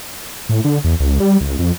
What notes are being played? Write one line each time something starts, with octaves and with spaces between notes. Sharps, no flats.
A2
D3
E2
C#2
G3
C#2
F2